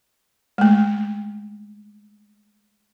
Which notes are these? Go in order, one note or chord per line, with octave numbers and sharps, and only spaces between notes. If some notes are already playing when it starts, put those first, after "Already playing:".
G#3 A3